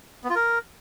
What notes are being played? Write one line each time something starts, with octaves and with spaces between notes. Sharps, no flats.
B3
F4
A#4